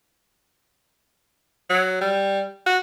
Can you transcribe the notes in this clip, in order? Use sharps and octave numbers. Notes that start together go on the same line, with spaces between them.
F#3
G3
F#4